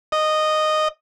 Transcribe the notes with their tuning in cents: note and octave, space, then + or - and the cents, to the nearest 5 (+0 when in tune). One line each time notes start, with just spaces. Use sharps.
D#5 -10